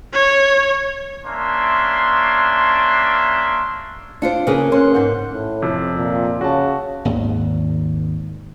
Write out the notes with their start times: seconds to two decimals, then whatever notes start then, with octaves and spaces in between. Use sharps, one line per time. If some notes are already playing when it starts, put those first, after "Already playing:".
0.14 C#5
1.25 A#3 C#4 D4 E5 C6
4.22 D4 F4 C5 C#7 D7
4.47 C#3 A#3 G#4 A#4 B4
4.72 C#4 C6 F#6
4.93 G#2 C4 F#5
5.32 A2
5.62 F2 C3
5.97 A#2
6.41 C#3 F#4 A5
7.05 G#1 D#2 G#2